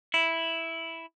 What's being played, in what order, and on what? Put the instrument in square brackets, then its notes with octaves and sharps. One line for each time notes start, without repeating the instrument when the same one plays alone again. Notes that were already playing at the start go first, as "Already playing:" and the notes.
[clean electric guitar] E4